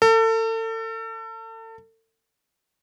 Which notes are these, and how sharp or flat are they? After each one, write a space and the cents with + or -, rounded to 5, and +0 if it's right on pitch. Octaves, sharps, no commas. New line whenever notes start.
A4 +35